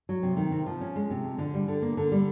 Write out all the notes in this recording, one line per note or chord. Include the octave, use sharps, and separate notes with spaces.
F#3
C3
D#3
C3
F3
C#4
G#3
C3
F3
D3
G3
D3
A#3
D3
G3